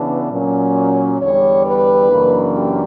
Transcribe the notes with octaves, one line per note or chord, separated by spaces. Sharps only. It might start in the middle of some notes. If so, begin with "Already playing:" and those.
Already playing: C#3 E3 B3 D4
A#2 F#3 C#4
E2 D3 G3 C#5
B4
F#2 C#3 E3 A#3 D4
G4